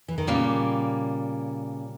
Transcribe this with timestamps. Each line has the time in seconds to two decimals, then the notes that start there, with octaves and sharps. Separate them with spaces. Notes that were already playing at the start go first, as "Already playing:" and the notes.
0.08 E3
0.18 D#3
0.27 A#2 C#3 G3 A#3